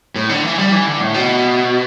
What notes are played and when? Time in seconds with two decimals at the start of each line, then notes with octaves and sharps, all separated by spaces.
0.16 A2
0.30 D3
0.44 E3
0.58 G3
0.73 E3
0.86 D3
1.01 A2
1.14 B2